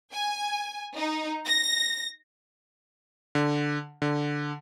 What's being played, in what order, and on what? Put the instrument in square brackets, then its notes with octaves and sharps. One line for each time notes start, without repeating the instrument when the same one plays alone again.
[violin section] G#5
D#4
A#6
[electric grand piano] D3
D3